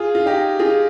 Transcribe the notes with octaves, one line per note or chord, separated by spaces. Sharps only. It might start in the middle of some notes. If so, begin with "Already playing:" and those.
Already playing: F4 G#4
F4
D#4 G4
F4 G#4